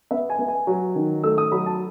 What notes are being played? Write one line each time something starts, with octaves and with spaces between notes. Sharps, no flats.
B3 E5
G#5
B3
G#5
F#3
D#3
A3 E6
D#6
F#3 B5
A5